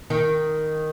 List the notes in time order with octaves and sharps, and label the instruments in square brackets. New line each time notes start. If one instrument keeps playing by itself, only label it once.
[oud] D#3